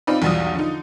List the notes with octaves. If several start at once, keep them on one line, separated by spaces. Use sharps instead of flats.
C4 D#4 F4 D5 B5
B1 E2 F#3 G3 F4 D#6
D3 F3 D#4